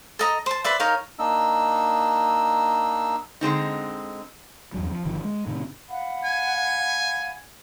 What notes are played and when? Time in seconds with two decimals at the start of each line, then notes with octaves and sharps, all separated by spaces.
0.19 A4 D#5 A#5
0.46 C5 A5
0.64 B4 C5 D5 E5
0.80 D#4 A#4 C#5 F5
1.19 A#3 D4 D#4 D#5 E6
3.41 D3 G#3 C4 D#4
4.74 E2 G2 F#3
4.91 F3
5.05 G1 D#3 F3
5.24 G#3
5.47 A2 C3 D#3
5.89 F5 F#5 B5
6.25 G#5